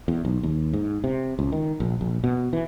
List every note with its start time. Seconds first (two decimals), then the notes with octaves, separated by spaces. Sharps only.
0.08 E2
0.25 B1
0.43 D#2
0.73 G#2
1.04 C3
1.39 C#2
1.52 D#3
1.80 A#1
2.01 A#1
2.24 B2
2.53 E3